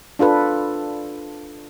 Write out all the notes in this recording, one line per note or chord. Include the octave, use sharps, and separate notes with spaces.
D4 F4 A4 B4